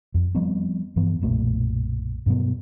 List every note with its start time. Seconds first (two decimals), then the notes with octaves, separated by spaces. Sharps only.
0.14 F2 F3
0.35 F3 G3 B3 C4
0.96 G2 E3 F3 B3
1.20 F#1 B1 A#2 A3
2.26 G2 B2 F#3 B3